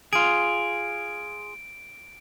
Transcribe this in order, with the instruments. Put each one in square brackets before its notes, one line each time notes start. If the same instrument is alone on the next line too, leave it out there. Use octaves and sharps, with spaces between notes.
[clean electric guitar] F4 G#4 [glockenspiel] D7